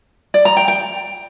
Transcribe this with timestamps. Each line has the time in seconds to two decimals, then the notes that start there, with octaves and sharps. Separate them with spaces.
0.34 D5
0.45 A#5
0.57 G5
0.68 G5